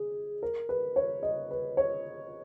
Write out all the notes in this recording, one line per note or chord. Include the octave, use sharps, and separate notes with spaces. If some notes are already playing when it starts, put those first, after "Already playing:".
Already playing: G#4
A#4
B4
C#5
D#5
B4
C#5